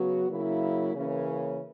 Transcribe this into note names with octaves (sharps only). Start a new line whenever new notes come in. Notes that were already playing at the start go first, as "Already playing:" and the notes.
Already playing: C#3 F#3 B3 F#4
C#3 F#3 A#3 E4
C#3 E3 A#3 C#4